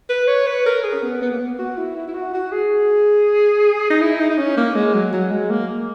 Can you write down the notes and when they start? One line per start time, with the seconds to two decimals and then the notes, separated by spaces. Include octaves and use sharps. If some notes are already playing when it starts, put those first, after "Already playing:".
0.09 B4
0.28 C#5
0.47 B4
0.66 A#4
0.84 G#4
0.93 C#4
1.03 B3
1.22 B3
1.31 A#3
1.41 B3
1.59 F#4
1.77 E4
1.97 E4
2.08 E4
2.14 F#4
2.34 F#4
2.52 G#4
3.90 D#4
4.01 E4
4.19 D#4
4.29 D#4
4.38 C#4
4.57 A#3
4.75 G#3
4.94 F#3
5.13 F#3
5.31 G#3
5.50 A#3